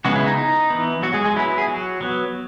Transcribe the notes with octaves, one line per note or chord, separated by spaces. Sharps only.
C#3 F#3 G#3 B3 F#4
E4
D#4
D#4
E3 B3
F#3 F#4
G#3 G#4
G#3 G#4
F#3 B3 E4
G#4
F#3 F#4
F#3 B3